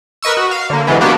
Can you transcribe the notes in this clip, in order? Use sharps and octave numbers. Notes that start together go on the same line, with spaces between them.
A#4 B4 D#5 C#6 E6
F#4
F5
D3 A#3
C3 E3 G#3 B3
A#3 B3 D4 F#4 G4